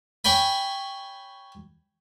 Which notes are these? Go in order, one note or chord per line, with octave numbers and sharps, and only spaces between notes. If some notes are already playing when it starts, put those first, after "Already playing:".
C#5 G5 G#5 B5